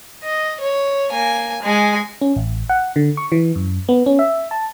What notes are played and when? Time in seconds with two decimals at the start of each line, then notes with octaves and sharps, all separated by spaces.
0.24 D#5
0.60 C#5
1.11 A#3 G#5
1.63 G#3 G#5
2.21 C#4
2.36 A1
2.70 F#5
2.96 D3
3.17 C#6
3.32 E3
3.55 F#2
3.89 B3
4.06 C#4
4.19 E5
4.51 A5